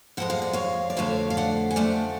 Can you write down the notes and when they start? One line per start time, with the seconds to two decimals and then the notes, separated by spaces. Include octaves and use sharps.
0.17 F2 F3 G#3 F#5
0.30 F5
0.42 D5
0.53 C#5 F5
0.90 D5
0.97 F2 D3 F3 A3 C#5 F5
1.30 F5
1.37 D5 F#5
1.71 G#5
1.76 F2 D3 F3 A3 D5 F#5